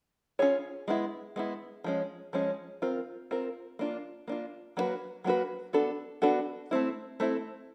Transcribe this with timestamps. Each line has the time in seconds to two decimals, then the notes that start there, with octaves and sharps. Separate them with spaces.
0.39 C#4 F4 G#4 C#5
0.88 G#3 B3 E4
1.36 G#3 B3 E4
1.84 F3 G#3 C#4
2.33 F3 G#3 C#4
2.82 C4 F4 A#4
3.31 C4 F4 A#4
3.79 A#3 D4 F4
4.28 A#3 D4 F4
4.77 F#3 A#3 D4 F#4 B4
5.24 F#3 A#3 D4 F#4 B4
5.73 B3 D4 F#4 A4
6.22 B3 D4 F#4 A4
6.71 A3 C4 E4
7.20 A3 C4 E4